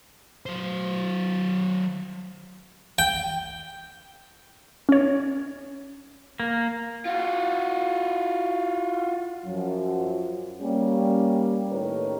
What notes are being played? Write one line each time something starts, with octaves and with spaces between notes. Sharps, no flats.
F#3 C5
G5
C#4 C#5
A#3
F4 F#4
F#2 F3 F#3
G3 A#3 C#4
A2 D#3 G4 A#4 B4 C#5